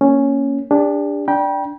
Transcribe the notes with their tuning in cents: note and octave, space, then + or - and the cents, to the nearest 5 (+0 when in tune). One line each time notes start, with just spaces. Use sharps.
A#3 +0 C#4 +0
D4 -5 G4 +45
D4 +0 G5 +0 B5 -45